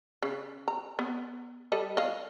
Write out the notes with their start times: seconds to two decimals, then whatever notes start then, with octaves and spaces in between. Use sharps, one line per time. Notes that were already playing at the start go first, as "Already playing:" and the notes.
0.22 C#3
0.68 A#5
0.99 B3
1.72 G3 A4 D#5
1.97 D#5 F5